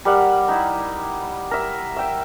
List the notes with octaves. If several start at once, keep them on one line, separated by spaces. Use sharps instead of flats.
G3 A#4 F#5
D#4 E4
A#4 E5
E5 G5